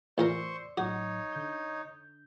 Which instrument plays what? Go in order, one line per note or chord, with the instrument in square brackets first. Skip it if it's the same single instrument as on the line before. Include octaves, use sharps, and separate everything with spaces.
[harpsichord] A1 F4 A#4 [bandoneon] C5 C6 C#6 [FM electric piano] D5 E6
[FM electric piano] A1 A2 F#3 [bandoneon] D#4 C#5 [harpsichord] F#4
[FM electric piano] D3 G6